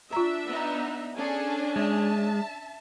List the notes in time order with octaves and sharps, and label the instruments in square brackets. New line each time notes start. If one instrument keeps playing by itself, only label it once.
[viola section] D4 E5 [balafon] F4 A#5
[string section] B3 D#4
[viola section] C#4 D4 G#5 [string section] G#4 A4
[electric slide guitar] G#3 [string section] E5 A5